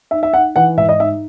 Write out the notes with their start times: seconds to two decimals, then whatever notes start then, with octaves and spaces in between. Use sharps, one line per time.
0.11 D#4 E5
0.23 E5
0.33 D#4 F#5
0.56 E3 F#5
0.77 G#2 E5
0.89 D#5
1.00 D#4 E5